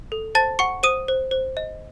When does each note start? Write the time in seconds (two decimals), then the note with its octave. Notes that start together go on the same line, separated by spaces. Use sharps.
0.12 A4
0.35 C5 A5 A6
0.59 F#5 C#6 C#7
0.83 C5 D#6 D#7
1.08 C5
1.31 C5
1.57 D#5